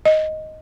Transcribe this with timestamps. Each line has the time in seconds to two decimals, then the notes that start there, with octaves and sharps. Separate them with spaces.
0.05 D#5